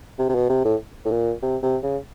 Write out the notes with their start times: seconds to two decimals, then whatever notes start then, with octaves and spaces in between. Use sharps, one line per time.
0.19 C3
0.29 C3
0.35 B2
0.50 C3
0.65 A2
1.05 A2
1.11 A#2
1.43 C3
1.63 C3
1.83 C#3